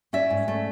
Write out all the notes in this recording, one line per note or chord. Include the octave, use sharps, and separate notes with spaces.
C#4 D5 E5
G#2
A3